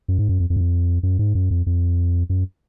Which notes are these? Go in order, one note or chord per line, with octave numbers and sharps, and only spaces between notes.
F#2
G#2
F#2
F2
F2
F#2
F2
F#2
G#2
F#2
F2
F2
F#2